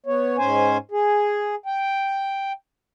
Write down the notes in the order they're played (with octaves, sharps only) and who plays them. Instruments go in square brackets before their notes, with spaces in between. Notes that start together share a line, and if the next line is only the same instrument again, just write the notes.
[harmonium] B3 C#5
G#2 C#4 C5 G#5
G#4
G5